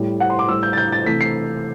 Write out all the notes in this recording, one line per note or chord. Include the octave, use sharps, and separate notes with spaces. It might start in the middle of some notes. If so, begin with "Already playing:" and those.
Already playing: A2 G3
F#5
C6
D6
A2 G3 E6
G6
A6
G6
A6
C3 E3 A3 B6
C7